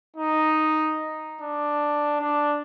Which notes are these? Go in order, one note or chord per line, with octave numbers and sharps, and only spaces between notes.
D#4
D4
D4